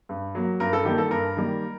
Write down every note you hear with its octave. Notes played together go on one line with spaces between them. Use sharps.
G2
F#3 A#3
G2 A#4
A4
D#3 G3 A#3 G4
A4
G2 A#4
D#3 G3 A#3